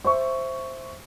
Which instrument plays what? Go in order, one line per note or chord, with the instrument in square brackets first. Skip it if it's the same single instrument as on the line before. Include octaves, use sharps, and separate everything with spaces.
[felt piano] C5 E5 C#6